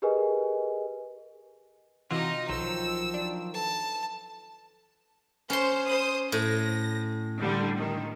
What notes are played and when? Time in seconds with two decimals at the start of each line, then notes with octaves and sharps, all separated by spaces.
0.02 G4 G#4 A#4 B4 D#5 G#5
2.11 C3 E3 D#4 F4 F#4 D#5
2.49 B1 D#3 F3 F#3 C5 E6
3.14 D4
3.54 A4 B4 A5
5.50 C#4 C5 C6
5.86 C5 D#6
6.32 A2 A#6
7.40 D3 G3
7.77 D#3